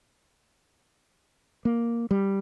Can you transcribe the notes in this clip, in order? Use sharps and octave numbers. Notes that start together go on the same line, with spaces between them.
A#3
G3